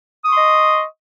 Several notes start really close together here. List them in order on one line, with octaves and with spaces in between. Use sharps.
D#6 C#6 C6 D#5